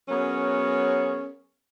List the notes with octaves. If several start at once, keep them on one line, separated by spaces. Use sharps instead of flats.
F#3 B3 C#4 G#4 A#4 C#5